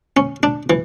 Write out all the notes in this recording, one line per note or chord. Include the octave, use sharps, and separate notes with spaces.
C#4
D4
E3